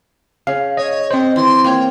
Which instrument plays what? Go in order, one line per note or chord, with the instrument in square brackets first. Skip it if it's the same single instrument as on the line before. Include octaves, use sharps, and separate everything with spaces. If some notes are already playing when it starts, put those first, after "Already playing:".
[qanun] C#3 [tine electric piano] F5
[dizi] C#5 [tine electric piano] D#5
[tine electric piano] C4 C5 [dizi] D#5
[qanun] E3 [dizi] C6
[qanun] A#3 C#5 [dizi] G5